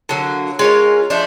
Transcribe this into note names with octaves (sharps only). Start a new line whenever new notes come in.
D3 F#3 A#3
G#3 C#4 F4 A#4
F3 A3 D4